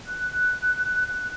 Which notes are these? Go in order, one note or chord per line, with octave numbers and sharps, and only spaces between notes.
F#6